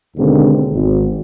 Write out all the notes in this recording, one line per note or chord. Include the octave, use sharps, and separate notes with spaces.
D#2 B2 D3 D#3 G#3 C4
G#1